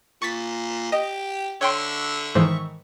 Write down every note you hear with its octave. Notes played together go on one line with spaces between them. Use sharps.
A#2 C#6 A6 B6
G4 D#5
D3 C#5 E5 G5 C6 C#6
G#2 D#3 E3 C5